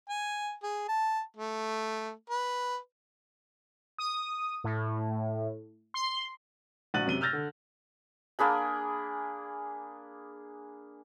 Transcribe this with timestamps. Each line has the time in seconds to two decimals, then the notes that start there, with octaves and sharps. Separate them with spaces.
0.09 G#5
0.63 G#4
0.88 A5
1.37 A3
2.30 B4
3.98 D#6
4.64 A2
5.94 C6
6.94 A#1 F#4 F#6 A6 D#7 F#7
7.06 F#2 C3 D#7 G7
7.21 E6 F6 G6 A6 A#6 F7
7.33 D3
8.39 A#3 D4 G#4 B5